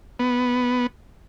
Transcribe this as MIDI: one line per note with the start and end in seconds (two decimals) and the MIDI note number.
0.19 0.87 59